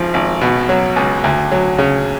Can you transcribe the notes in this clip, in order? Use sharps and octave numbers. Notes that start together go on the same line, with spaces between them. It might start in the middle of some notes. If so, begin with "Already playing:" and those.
Already playing: G#1 F3
G#1
B2
F#3
C#2
D2
F#3
C#3